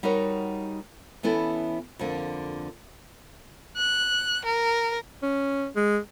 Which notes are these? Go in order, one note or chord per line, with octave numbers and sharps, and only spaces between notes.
G3 D#4 F#4 A#4 C#5
E3 B3 C#4 E4 A4
F2 D3 A#3
F#6
A#4
C#4
G#3